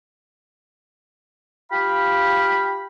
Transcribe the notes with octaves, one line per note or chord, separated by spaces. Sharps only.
F4 G4 F5 G5 B5